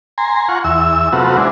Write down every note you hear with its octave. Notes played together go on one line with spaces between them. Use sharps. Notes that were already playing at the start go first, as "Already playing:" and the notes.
G#5 A#5 C6
F4 F#5 C#6
E2 E5 E6
C3 F#3 A3 B3 F4 F#4
G#3 C4 D4 E4